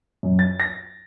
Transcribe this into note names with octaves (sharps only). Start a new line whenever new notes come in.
F#2
A6
A#6